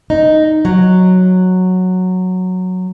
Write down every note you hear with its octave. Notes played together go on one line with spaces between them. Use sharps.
D#4
F#3